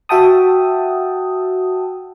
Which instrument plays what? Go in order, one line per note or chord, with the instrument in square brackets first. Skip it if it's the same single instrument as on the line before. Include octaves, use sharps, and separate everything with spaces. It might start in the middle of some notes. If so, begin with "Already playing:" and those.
[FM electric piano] F#4 E5 F#5 G5 A5 D#6